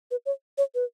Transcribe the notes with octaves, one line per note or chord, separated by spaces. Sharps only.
B4
C#5
C#5
B4